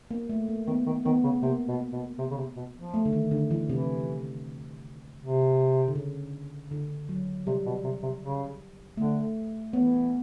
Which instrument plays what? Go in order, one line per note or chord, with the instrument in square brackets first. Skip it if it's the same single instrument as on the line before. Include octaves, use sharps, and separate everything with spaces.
[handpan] A#3
A3
A#3
[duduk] D#3 [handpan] B3
[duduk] D#3
[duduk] D#3 [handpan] B3
[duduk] C#3
[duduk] C3 [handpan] A#3
[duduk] B2
B2
C3
C#3
C3
B2
F3
[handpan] A3
D3
D#3
D3
E3
[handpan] C3 [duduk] E3
[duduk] C3
[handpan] D3
C#3
D3
F#3
[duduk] C3 [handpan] G3
[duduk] B2
C3
C3
C#3
[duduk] D3 [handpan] A3
[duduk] E3 [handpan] B3